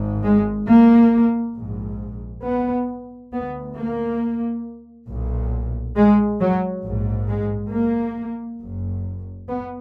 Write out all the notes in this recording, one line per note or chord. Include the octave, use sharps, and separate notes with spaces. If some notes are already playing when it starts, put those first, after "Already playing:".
Already playing: G#1 G#2
G#3
A#3
A#1 G#2
B3
D2 B3
A#3
B1 A#2
G#3
F#3
A#1 G#2
G#3
A#3
F#1 F#2
B3